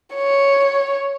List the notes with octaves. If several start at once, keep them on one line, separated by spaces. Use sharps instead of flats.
C#5